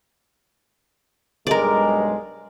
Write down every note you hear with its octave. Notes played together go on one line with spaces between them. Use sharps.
B1 G2 G#3 A#4 D5